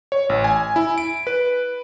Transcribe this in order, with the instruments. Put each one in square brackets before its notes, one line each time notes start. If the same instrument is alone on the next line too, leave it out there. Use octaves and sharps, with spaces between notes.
[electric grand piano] C#5
A1
G#5
E4
D7
B4